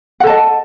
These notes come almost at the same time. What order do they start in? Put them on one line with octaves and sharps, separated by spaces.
F#5 A4 A5 D#5